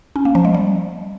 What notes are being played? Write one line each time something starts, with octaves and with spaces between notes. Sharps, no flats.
C#4
A#3
F3
G#3
G3